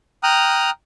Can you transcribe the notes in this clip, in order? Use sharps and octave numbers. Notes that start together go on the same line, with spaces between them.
G5 A#5 D#6 F6 F#6